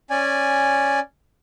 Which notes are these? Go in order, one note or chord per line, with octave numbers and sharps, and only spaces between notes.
C#4 D5 G#5